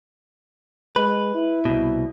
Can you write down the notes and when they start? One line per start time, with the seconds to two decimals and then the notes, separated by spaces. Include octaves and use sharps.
0.96 G#3 B4
1.34 E4
1.65 C2 B2